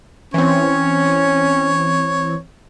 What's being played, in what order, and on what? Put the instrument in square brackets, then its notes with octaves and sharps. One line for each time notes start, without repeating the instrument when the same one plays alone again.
[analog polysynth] E3 C4 [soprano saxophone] C#4 [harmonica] C#5